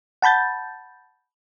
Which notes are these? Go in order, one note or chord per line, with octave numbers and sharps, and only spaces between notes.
F#5 A5 B5 G6 A6